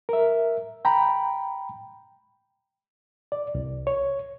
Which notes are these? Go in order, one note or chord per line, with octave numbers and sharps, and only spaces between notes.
A#4 E5
G5 A#5 B5
D5
C2
C#5